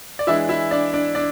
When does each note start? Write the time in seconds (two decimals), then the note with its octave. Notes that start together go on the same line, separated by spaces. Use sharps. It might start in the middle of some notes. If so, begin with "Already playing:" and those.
0.19 D5
0.27 E3 G#3 D4 E4 E5
0.49 E4 E5
0.71 D4 D5
0.93 D4 D5
1.15 D4 D5